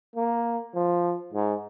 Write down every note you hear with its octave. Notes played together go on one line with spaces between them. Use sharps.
A#3
F3
G#2